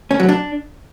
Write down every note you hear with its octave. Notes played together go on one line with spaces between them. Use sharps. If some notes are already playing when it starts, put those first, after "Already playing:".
C#4
F#3
D4